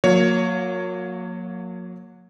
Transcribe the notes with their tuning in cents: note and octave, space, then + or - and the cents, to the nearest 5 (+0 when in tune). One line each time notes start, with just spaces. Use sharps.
F#3 -40 A#3 -10 C#5 +10